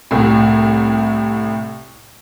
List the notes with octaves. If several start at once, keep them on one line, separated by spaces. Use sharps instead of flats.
C2 A2